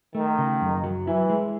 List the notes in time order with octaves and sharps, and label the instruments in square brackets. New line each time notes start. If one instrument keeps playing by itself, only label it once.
[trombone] D#3 [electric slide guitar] A3
[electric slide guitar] C#3
F#2
F#3
[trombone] E3 [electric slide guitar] E4
[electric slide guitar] G#3